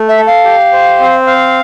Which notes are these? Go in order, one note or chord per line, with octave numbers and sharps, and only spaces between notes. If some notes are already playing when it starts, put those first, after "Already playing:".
Already playing: A3
E5
A4
F5
G4
C5
C4
F5